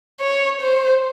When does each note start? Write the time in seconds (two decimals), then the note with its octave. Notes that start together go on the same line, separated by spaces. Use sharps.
0.20 C#5
0.61 C5